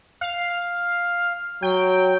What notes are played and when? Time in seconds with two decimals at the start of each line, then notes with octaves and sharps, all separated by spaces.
0.21 F5
1.62 F#3 G5